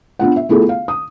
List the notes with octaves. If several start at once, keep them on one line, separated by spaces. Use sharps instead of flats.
B3 D4 F4 F#5
E5
A3 B3 E4 F4 G#4 A4
F5
D#6